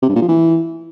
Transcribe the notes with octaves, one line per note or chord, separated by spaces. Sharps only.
C3
G2
A#2
F3
E3